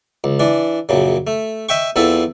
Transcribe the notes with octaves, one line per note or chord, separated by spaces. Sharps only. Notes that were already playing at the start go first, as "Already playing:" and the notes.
C#2
E3 D4
A#1 F#2 C#3
A3
D#5 E5 G5 C#6
E2 F3 C4 E4 A4